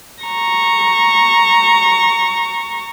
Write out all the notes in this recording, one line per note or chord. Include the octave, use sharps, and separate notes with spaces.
A#5 C#6